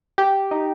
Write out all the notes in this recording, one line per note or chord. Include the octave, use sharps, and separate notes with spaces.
G4
D#4